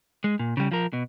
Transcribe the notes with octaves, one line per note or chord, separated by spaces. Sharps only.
G#3
A#2
C#3 G3
F3 A#4
B2